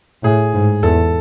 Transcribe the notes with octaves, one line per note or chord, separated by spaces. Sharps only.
A2 G#4
G#2
E2 A4